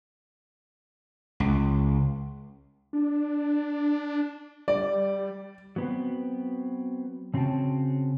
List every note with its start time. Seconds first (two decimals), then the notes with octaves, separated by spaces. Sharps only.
1.40 C#2
2.93 D4
4.68 G3 D5
5.76 F#3 B3 C4
7.34 C#3 C4 C#4 F#4 G5 A5